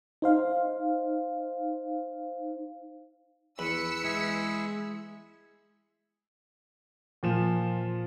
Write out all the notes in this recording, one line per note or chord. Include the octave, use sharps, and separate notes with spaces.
D#4 C5 F5
E2 B4 B5 E6 B6 C#7
G#3 E4 G#4
A#2 F3 E7